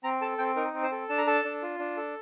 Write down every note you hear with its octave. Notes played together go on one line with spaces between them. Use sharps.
C4 A#5
A4 A5
C4 G5
D#4 A#4
C4
C5
A4
D4 A5
A#5
A4 A5
D4
F4
D4
A4